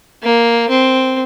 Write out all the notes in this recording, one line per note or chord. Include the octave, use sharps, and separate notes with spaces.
A#3
C4